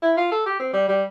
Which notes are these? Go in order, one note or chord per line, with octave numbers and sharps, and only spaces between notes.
E4
F4
A4
G4
C4
G3
G3